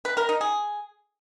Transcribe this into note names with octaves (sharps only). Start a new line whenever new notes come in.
B4
A#4
D#4
G#4